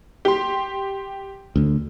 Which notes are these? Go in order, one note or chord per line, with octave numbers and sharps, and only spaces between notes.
G4 C6
D2 D3